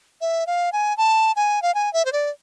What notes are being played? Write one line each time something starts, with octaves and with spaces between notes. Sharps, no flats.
E5
F5
G#5
A5
G#5
F5
G#5
E5
C5
D5